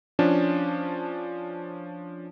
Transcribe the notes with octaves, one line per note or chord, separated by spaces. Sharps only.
F3 C#4 D4